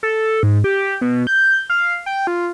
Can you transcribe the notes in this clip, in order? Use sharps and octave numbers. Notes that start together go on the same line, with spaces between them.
A4
G#2
G4
B2
G6
F5
G5
F4